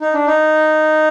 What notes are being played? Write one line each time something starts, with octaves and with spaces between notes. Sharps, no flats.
D#4
D4
D#4